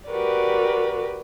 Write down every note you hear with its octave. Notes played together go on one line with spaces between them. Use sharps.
F#4 G4 A#4 B4 D5